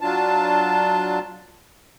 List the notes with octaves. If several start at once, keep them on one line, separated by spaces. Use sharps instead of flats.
F#3 D4 F4 A5